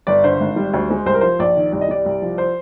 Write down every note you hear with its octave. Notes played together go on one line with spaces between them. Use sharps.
G1 D5
D3 C5
G#1
G3
D2
G#3
C2 C5
A#4
F3 C5
A#1 D5
D#3
C2 D5
D#5
G3 D5
C2
F3
C5